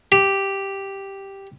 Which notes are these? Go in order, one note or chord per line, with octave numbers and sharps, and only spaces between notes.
G4